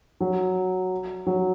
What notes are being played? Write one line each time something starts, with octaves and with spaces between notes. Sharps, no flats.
F#3
F#3